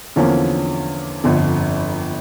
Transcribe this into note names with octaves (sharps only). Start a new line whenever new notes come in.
E2 D3 F3 A#3 C#4
G1 F2 D3